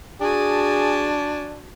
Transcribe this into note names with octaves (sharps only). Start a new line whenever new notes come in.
D4 F#4 G#4 G#5 A5